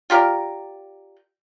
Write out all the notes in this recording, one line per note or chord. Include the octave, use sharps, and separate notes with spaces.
F4 G4 A#4 D5